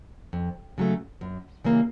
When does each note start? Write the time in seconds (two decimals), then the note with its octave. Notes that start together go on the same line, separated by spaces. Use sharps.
0.33 F2
0.78 C#3 F#3 A3
1.21 F#2
1.64 C#3 E3 G3 A#3